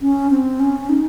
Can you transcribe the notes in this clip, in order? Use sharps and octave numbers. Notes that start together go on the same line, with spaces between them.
C#4
C4
C#4
D#4